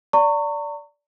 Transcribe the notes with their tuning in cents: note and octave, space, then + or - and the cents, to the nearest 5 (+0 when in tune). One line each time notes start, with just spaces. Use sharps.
D5 -15 A#5 -40 C#6 +0